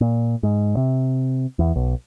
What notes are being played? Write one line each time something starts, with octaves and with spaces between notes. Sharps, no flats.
A#2
G#2
C3
E2
B1